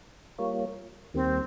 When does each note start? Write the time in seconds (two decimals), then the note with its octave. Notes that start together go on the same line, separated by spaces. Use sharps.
0.38 G3 A#3 F4 A#4 C#5
1.14 D#2 D#3 G3 A#3 C4